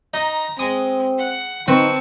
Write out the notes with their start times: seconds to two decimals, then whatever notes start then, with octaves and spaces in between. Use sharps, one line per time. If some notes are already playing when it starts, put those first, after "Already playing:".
0.14 D#4 A#5
0.59 G#3 C4 D#6
1.18 F#5
1.68 C4 D#4 B4 A5 C#6